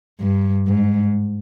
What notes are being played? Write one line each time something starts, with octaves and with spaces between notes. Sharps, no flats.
G2
G#2